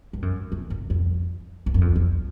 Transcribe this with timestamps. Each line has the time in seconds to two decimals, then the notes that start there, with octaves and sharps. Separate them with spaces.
0.13 G2
0.22 F#2
0.52 F2
0.70 F#2
0.90 F2
1.66 E2
1.74 F#2
1.81 F2
1.96 E2